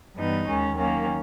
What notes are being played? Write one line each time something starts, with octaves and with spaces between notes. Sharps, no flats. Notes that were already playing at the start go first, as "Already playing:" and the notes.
G2 E3 G3 B3 D#4
D#2 D#3 G#3 C#4
D#3 F#3 A#3 C#4